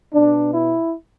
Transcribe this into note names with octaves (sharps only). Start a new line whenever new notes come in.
B2 B3 D4
E4